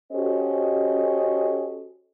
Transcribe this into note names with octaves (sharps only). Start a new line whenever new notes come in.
C#4 F#4 G4 A4 C5 D#5